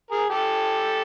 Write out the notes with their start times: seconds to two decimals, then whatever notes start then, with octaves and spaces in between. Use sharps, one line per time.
0.11 G#4 A#4
0.30 G4 A4